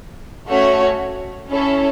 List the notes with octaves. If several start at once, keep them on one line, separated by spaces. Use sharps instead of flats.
A3 C#4 F#4 C#5
C#4 E4 A4